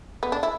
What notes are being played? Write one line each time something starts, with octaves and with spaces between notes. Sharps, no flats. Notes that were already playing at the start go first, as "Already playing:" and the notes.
B3
D4
E4